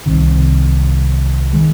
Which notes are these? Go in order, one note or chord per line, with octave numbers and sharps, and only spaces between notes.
C2 C3 D#3
D#3 G#3